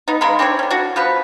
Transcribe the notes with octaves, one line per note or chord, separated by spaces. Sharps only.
B3 D#4
C#3 G#3 A#4 B5
C4 D4 A4 C#5
B3 C#4
D4 F#4
F3 B3 B4